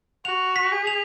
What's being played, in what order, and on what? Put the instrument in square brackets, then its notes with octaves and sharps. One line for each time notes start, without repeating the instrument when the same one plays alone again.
[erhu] F#4 [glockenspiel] F7
[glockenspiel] B6
[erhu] G#4
[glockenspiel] F7